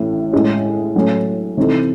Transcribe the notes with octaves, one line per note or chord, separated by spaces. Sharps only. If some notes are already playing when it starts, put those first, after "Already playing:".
Already playing: A1 A2 E3
A2 G#3 C#4
A2 F#3 A3 C#4
C3 E3 C4 D#4 A4